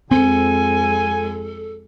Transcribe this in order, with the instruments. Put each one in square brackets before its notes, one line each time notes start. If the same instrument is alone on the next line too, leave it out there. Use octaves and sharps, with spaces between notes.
[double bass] F2 G#3 [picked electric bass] C4 [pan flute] A4 [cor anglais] G#5